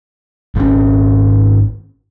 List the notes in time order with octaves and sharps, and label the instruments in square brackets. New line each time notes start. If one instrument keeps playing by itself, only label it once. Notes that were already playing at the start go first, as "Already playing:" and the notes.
[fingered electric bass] G#1 C#4